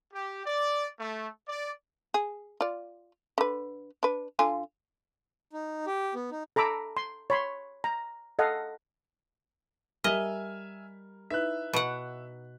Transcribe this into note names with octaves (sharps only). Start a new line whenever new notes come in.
G4
D5
A3
D5
G#4
F4 D5
D3 B4
D4 B4
D3 F4 G#5
D#4
G4
B3
D#4
A4 A#5 B5 D6 E6
C6
C#5 B5 C6
A#5
A4 D#5 F5 F#5
G3 A#4 D#5 E5 G#5 F6
D#4 E4 B4 E5 F#6
B2 F#5